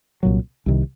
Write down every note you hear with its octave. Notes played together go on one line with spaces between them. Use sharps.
C2 A#2 F#3
C2 C3 D#3